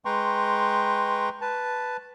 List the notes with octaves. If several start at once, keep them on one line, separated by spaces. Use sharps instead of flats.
G#3 B4 G5 A#5 C6 C#6
B4 A5